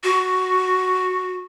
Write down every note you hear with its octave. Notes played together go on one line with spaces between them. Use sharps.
F#4